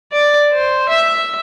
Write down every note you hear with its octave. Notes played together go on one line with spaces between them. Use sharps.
D5
C5
E5